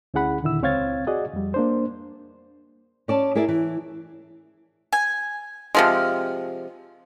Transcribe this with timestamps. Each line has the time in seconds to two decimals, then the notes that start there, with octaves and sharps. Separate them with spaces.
0.14 D2 C#4 E4 G#4 F#5 B5
0.42 D#2 A#2 D3 D#3 E4 E6
0.62 C#2 C4 C#5 F5 G#6 A6
1.07 F#4 G#4 D5 D#5 F#5
1.33 F2 G3
1.54 A#3 D4 C5
3.08 C#4 D5 A5
3.35 E4 G#4 A#4 D5 E5
3.48 E3
4.93 G#5
5.75 C3 F3 G#3 F6